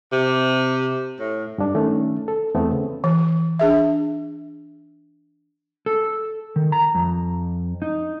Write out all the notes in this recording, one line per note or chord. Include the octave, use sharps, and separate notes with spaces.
C3
A2
G2 D4
D#3 A3 C#4
A4
E2 A3 B3 C4
C#3
E3
D4 G#4 E5
A4
D#3
A#5
F2
D#4